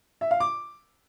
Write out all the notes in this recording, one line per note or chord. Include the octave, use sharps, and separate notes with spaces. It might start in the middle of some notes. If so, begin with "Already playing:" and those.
E5
F5
D6